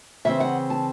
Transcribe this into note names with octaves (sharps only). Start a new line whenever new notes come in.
C#3 E3 C4 E5
F#5
A5